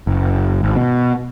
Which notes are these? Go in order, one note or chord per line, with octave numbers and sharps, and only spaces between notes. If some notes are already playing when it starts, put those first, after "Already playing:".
F#1
G#1
B2